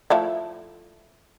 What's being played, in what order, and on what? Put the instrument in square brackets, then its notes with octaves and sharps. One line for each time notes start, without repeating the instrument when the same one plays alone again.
[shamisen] F3 A3 E4